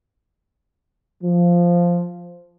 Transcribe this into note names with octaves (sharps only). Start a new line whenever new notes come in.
F3